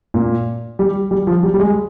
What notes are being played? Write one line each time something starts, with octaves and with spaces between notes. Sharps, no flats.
A#2
G3
G3
F3
G3
G3
G#3